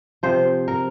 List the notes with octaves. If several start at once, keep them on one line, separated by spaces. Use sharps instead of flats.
C3 F3 C5
A#4